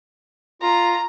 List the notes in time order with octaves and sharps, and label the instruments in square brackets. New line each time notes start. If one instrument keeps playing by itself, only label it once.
[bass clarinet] F4 [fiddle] A#5